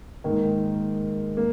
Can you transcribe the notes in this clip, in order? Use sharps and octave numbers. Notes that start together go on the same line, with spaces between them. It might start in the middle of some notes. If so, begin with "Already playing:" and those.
G#2 D#3 A#3
A#3